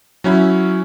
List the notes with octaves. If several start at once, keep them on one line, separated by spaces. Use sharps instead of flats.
F#3 C#4 E4